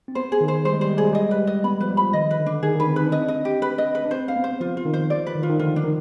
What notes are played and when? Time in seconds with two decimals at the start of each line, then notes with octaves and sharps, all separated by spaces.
0.08 C4
0.15 B3 C5
0.32 G#4
0.41 D#3
0.48 C5
0.65 G3 C5
0.73 G#3
0.81 G3 C5
0.89 G#3
0.97 G3 G#4
1.05 G#3
1.12 G3 D#5
1.21 G#3
1.29 G3 B4
1.47 D#5
1.64 B3 B5
1.80 F3 B4
1.89 G3
1.97 F3 B5
2.13 D#3 D#5
2.31 B4
2.39 D3
2.46 D4
2.54 D3
2.63 D#3 G#4
2.76 D#3
2.80 B4
2.88 C4
2.96 D#4 B4
3.07 D4
3.12 C4 D#5
3.21 D4
3.28 D#5
3.45 G4
3.62 B4
3.78 D#5
3.95 B4
4.05 D4
4.11 C4 C5
4.28 F5
4.36 B3
4.44 C5
4.60 F3 F4
4.77 F4
4.85 D#3
4.93 C5
5.10 F3 D5
5.27 B4
5.35 D#3
5.43 F3 F4
5.49 D#3
5.59 D3 F4
5.76 D4
5.84 D#3